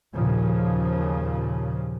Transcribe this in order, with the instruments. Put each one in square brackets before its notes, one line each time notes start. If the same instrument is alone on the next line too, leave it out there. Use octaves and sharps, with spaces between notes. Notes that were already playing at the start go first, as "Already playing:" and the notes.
[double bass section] D#2 A#2 C#3 F3